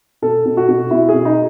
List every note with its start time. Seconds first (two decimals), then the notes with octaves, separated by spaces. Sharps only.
0.22 B2 A4
0.45 B2
0.57 F#4
0.69 B2
0.91 B2 E4
1.09 G#4
1.14 B2
1.25 D#4